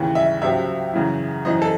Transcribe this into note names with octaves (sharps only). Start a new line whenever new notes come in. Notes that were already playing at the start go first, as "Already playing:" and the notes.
Already playing: D#2 C#3 E3
E5
C#2 C3 F#3 C4 E5
F#2 C#3 E3
F#2 E3 C4 D#4 D#5
A4